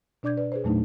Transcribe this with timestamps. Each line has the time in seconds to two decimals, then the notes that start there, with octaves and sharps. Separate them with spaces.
0.23 B2 D4 D5 D6 G6 G#6
0.37 B4 D5
0.52 G#4 B4 C5
0.64 E2 A#2 F#3 A3 D4 D#4